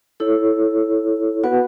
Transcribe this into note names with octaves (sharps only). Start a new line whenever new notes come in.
E4 A4 C#5
B3 F#4 B4 F#5